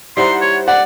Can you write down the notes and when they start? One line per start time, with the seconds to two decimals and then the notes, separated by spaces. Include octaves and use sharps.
0.17 G3 D#4 E4 C5 F#5 C6
0.41 C#5
0.68 D5 F#5